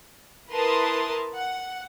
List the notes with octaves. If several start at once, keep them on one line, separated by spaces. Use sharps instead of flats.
E4 A#4 B4 A5 C6 D#6
F#5